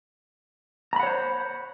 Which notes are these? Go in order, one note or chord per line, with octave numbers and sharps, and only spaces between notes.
C5 C#5 F#5 A#5 B5